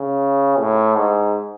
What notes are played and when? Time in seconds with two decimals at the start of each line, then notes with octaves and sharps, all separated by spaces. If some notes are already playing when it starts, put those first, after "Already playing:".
Already playing: C#3
0.60 A2
0.97 G#2